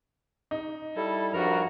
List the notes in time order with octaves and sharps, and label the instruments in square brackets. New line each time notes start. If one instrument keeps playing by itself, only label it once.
[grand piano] D#4
[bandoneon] G3 E4 [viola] A4
[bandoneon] G2 A#4 A#5 [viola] F3 F#4